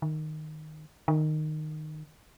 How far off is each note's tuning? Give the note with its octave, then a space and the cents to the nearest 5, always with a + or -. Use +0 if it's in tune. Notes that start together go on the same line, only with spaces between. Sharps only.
D#3 -10
D#3 -15